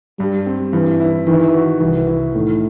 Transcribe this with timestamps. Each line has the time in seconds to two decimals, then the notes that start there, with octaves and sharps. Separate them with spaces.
0.19 G2 G3
0.46 C4
0.73 G2 E3
1.00 E4
1.27 D#3 E3
1.54 F#4
1.80 C2 E3
2.08 E4
2.34 A2 D#3